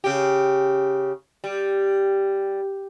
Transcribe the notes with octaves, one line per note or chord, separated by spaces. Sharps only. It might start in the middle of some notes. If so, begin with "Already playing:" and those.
C#3 G4
G3